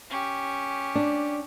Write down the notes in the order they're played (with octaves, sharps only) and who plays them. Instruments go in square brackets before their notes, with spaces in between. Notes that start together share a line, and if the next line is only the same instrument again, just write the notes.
[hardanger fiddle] C#4 G4
[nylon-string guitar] D4